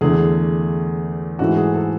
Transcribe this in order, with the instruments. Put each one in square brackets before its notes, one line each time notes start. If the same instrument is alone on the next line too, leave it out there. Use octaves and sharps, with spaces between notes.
[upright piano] E2 D3 A3 G#4
G#2 E3 A3 F#4
G#4
A4